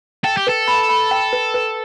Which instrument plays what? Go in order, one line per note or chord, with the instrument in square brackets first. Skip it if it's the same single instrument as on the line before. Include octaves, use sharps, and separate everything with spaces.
[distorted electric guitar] A4 [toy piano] G5
[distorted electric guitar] G4
[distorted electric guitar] A4 [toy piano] B4
[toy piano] B5
B5
G5
B4
B4